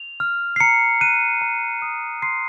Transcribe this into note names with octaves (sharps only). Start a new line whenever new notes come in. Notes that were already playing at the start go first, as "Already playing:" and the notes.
Already playing: F7
F6
C7
A#5 C#7
F#6 D#7
A#5
D#6
C6 C7